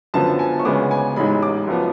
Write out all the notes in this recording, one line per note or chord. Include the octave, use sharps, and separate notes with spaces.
F#2 D3 F3 B3 A5
G#5
C#6
D2 C#3 G#3 B3 D6
G#5
A1 G#2 G#3 B5
D6
F#2 F3 B3